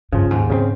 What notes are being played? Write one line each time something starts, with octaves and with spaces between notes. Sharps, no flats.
G2 C#3 F3
D#2 G#2
C#3 F3 C4